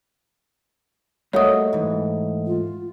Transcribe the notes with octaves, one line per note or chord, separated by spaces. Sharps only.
G3 A3 A#3 F#4 C#5 D#5 F#5 D#6
G#2 E3
F4